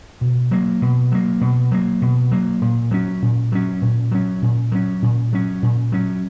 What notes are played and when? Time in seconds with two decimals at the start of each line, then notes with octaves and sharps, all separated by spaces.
0.21 B2
0.51 F#3 A#3
0.82 B2
1.12 F#3 A#3
1.41 B2
1.72 F#3 A#3
2.02 B2
2.32 F#3 A#3
2.62 A#2
2.91 F#3 C#4
3.22 A#2
3.52 F#3 C#4
3.82 A#2
4.12 F#3 C#4
4.42 A#2
4.72 F#3 C#4
5.02 A#2
5.33 F#3 C#4
5.63 A#2
5.92 F#3 C#4